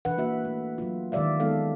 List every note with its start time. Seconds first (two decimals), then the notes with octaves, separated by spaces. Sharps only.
0.05 B2 E3 D4 B4 F#5
0.18 A#3 F#4 E5
0.45 A3
0.78 F#3 F4
1.12 D#3 G#3 G4 D5 E5 F5
1.40 G#3 B3 D#4 A4 F5